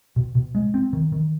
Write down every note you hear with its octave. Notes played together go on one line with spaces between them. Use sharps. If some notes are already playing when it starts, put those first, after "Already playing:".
B2
B2
G#3
C4
D#3
D#3